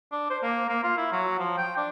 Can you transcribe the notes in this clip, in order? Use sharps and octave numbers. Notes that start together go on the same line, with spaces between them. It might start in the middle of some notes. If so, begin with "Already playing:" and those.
D4
C5
A#3
A#3
F4
E4
F#3
F3
G5
D4